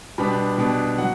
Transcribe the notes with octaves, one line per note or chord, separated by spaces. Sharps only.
B2 G3 B3 D4 B5
B2 G3 B3 D4
D3 F#3 F#5